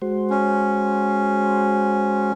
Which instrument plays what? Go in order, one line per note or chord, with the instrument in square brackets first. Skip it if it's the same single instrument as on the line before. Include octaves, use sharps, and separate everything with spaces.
[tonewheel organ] G#3 F#4 C5
[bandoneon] C#4